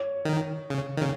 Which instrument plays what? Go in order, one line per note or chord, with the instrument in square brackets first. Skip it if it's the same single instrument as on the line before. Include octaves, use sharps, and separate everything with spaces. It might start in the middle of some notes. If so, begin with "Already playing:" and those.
Already playing: [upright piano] C#5
[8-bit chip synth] D#3
C#3
D#3
C#3